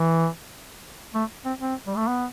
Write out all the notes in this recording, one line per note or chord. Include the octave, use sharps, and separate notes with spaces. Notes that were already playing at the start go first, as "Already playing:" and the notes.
Already playing: E3
A3
C4
C4
G3
A3
B3